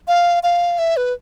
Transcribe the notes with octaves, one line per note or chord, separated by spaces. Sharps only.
F5
F5
E5
B4